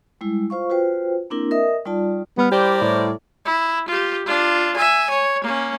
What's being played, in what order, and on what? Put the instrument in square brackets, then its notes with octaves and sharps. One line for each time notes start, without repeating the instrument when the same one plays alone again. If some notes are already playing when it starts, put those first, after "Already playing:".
[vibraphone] G3 G#3 E4
F4 C5 F5 C#6
F4 F#4 B4 C5 G5
A#3 C4 D4 E4 A#4
A#4 D#5 E5 D#6
G3 D#4 F4 D5 A5
[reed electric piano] G3 B5 F6 [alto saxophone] B3
[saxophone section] E4 A#4 D5 [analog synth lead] G4 [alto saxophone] C5
[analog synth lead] A2
[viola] E4
F4 G4
D4 F4
E5 G#5
C#5
A#3 C#4